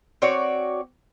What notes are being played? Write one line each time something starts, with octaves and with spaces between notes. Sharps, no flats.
C4 F#4 C#5 D5